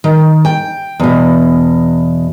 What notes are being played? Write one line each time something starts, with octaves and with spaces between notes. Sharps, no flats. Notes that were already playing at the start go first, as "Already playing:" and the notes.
D#3
G5
E2 B2